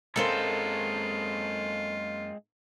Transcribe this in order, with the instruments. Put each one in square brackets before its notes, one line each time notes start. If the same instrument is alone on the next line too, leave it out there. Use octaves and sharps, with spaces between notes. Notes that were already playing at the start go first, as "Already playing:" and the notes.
[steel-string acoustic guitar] F#2 A#3 G#5 [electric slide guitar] G#3 C4 [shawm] F4 [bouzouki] A4 C5